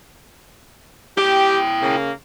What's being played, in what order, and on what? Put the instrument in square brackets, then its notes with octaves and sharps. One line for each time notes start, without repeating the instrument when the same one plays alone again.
[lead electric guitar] E4 G5 [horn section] G4
[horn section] C#3 A#3